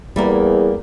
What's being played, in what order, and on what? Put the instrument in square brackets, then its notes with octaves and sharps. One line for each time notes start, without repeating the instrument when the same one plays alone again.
[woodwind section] E2 [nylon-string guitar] G3 A#3 A#4